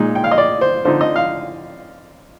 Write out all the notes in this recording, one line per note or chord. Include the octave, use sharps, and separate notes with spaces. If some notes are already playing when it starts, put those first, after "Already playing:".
Already playing: A#2 G#3 D#4
G5
F5
D#5
D5
C5
D3 F3 C4 D#4 C5
D#5
F5